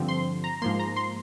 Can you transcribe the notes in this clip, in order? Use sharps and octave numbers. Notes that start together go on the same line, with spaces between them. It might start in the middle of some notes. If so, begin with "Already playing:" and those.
Already playing: G2 D3 F3 C4
C6
A#5
G#2 F3 A#3 C6
A#5
C6